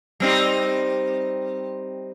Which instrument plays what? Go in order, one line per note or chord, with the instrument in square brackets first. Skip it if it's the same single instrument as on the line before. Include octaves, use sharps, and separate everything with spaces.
[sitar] G3 C4 D#4